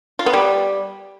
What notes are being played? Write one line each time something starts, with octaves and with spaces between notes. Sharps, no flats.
F4
B3
G3